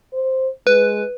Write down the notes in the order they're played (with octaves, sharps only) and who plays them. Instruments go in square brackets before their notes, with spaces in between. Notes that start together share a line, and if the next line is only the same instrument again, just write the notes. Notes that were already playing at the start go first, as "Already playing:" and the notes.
[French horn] C5
[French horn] G#3 [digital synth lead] B4